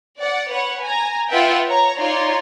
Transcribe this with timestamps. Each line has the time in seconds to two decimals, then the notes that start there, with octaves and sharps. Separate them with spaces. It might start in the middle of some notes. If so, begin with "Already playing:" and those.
0.19 D5 F#5
0.50 B4 C#5 F#5
0.82 G#5 A#5
1.29 F4 B4 E5 F#5 G5
1.66 C#5 A#5
1.98 D#4 F4 C#5 D5 A#5 C6